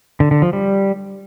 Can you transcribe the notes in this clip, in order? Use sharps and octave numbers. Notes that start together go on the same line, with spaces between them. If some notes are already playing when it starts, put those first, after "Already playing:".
D3
D3
F3
G3